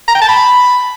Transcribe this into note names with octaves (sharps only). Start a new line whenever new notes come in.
A#5
G5
A5
B5